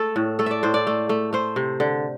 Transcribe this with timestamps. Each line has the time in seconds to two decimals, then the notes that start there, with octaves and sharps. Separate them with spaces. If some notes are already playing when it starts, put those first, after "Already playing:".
Already playing: A3 A4
0.16 A2
0.39 A3 A4
0.46 D5 E5
0.63 A2 C5
0.74 D5
0.87 A3
1.09 A3
1.33 A3 C5
1.56 C3
1.80 D3